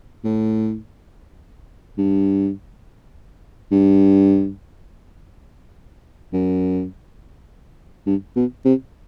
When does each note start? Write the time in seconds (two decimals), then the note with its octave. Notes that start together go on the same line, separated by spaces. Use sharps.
0.24 A2
1.98 G2
3.72 G2
6.33 F#2
8.07 G2
8.36 B2
8.65 C3